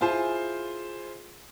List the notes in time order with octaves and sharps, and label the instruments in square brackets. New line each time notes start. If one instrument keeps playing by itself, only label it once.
[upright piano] E4 F4 G#4 C5 G#5